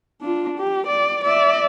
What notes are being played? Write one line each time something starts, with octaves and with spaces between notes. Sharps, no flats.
D4 F4
G4
D5
D5 E5